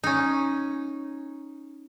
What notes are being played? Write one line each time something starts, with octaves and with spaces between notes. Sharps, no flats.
C#4 D#4